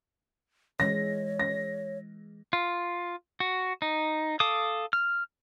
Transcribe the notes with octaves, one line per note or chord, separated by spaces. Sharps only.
E3 G#3 C#5 A#6
A#6
F4
F#4
D#4
A4 F5 D6 D#6
F6